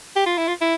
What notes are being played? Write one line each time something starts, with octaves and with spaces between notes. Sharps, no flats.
G4
F4
E4
F4
E4